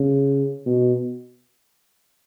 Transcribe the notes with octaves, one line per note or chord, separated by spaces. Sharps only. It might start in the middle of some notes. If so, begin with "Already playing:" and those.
Already playing: C#3
B2